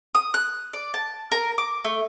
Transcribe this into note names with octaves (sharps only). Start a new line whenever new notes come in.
D#6
F#6
D5
A5
A#4
D6
A3